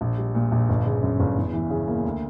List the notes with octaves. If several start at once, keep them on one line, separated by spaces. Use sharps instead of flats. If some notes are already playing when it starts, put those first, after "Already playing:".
A#1
G3
A#2
A#1
G1
C#3
F#2
G1
E2
E3
C#3
A#3
D2